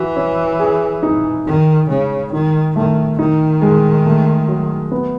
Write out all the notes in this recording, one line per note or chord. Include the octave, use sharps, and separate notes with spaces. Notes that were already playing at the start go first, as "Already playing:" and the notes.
Already playing: E3 F#4
C#4
G#4
D#4
D#3 D#4
C#3 G#3
D#3 D#4
D#3 A3
D#3 D#4
G#3
A3
F#3
B3